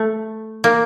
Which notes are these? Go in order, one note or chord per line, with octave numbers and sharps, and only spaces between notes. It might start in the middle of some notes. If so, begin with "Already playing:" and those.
Already playing: A3
A#3